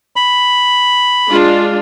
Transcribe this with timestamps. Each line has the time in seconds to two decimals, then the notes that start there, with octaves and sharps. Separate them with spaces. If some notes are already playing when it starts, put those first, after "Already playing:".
0.16 B5
1.29 G#3 D4 F4